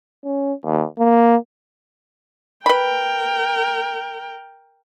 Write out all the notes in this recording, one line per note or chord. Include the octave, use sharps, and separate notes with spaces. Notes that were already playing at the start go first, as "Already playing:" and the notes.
C#4
D#2
A#3
A#4 B4 G5 B5